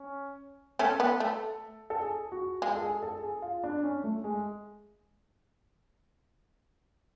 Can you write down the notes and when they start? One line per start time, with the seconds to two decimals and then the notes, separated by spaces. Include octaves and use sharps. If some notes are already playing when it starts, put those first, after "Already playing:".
Already playing: C#4
0.79 A3 C#4 A4
1.00 B3
1.20 A3
1.90 A4
2.02 G#4
2.32 F#4
2.62 G#3 F4
2.76 A4
2.81 G#4
3.03 A4
3.23 G#4
3.42 F4
3.64 D4
3.83 C#4
4.04 A3
4.24 G#3